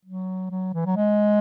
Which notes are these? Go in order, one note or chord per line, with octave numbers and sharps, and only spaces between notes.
F#3
F#3
E3
F#3
G#3